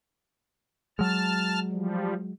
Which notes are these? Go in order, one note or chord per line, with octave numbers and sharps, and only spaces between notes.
F#3 G#3 A5 F6
F3 G3